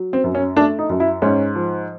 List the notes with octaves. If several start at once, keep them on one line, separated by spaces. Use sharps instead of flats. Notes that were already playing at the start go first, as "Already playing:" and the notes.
Already playing: F#3
C4
F#2
C#4
A3 D4
D#4
F#2
E4
G#2 C#4
F3